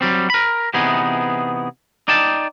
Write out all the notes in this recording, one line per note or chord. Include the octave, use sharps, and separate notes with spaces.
F#3 G3 C4
A#4 B5
C3 E3 B3 D#4 G#4
D#4 D5 G5 A5